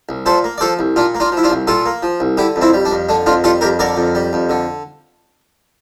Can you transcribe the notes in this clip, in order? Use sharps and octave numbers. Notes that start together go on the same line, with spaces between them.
C2
A#2 A4 C5
A#3
D5
F3 A4 C5
C2
A#2 D4 F4
A#3
D4 F4
F3
E4
D4 F4
C2
A#2 F4 A4
A#3
F3
C2
D3 E4 G4
F2
C4 E4
G3
D4
F2
D3 D4
F2 D4 F4
G3 F4 A4
F2 G4 A#4
D3 A#4 D5
F2
G3
F2
D3